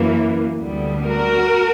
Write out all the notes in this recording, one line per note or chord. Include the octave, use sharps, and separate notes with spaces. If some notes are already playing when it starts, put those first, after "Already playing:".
Already playing: F#2 E3 A#3
D2 D3 G3 B3
F#4 A#4